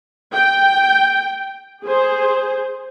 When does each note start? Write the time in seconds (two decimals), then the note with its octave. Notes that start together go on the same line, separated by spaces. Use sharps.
0.32 G5
1.83 G#4 C5